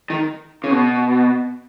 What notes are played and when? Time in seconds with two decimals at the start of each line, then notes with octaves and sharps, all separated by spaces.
0.10 D#3
0.64 C#3
0.71 B2